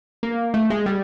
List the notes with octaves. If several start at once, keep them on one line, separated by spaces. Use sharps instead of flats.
A#3
A3
G#3
G3